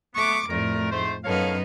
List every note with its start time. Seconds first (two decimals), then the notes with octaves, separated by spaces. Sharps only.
0.15 A3 B3 C#6 D6
0.49 F2 A2 G3 A3 A#4
0.92 G#2 A3 C5
1.24 F#2 B3 D#4 A4 C#5 F5